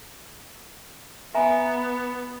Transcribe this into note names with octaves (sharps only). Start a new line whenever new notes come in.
B3 E5 G#5 A#5